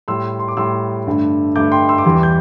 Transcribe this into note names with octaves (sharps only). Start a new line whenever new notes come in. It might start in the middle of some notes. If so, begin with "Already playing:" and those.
A2 G3 C6 E6
C6
D6
A2 G3 C6 E6
G2 D3 A3
G2 D3 A3 D6 G6
G5 C6
C6 E6
D6
E2 E3 G3 G5 C6
G6